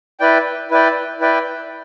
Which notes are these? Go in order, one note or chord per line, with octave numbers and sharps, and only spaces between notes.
E4 B4 D5 G5
E4 B4 D5 G5
E4 B4 D5 G5